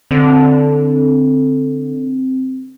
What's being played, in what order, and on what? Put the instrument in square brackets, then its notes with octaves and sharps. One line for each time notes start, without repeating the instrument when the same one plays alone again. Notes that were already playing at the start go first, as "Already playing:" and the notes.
[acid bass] D3 [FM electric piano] C4